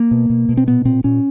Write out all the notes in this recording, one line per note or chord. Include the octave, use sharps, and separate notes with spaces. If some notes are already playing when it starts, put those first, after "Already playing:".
Already playing: A#3
B2
B2
B2
C4
A#2 B3
A#2 C4
A#2 C#4